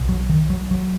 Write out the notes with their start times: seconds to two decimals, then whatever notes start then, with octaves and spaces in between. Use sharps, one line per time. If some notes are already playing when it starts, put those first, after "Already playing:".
Already playing: B1 B2
0.09 F#3
0.29 D#3
0.50 F#3
0.71 F#3